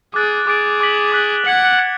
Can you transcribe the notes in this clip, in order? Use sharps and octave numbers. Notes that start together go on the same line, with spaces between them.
G#4 D6 F#6 A6 D7
G#4 D6 F#6 A6 D7
D6 F#6 B6 F#7
D6 F#6 B6 F#7
F#5 G#6 C#7 F#7
G#6 C#7 F#7